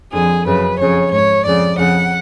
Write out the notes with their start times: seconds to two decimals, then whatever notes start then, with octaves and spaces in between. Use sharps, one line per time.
0.12 F2 D3 G#4
0.46 F#2 C#3 B4
0.78 F2 C#3 C#5
1.11 G#2 C#5
1.44 F2 C#3 D5
1.77 F2 C#3 F#5